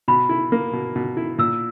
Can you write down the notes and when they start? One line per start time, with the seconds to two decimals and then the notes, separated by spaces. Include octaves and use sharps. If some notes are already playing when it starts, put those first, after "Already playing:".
0.08 B2 B5
0.29 E4
0.52 A#3
0.73 B2
0.96 B2
1.17 E4
1.38 A#2 E6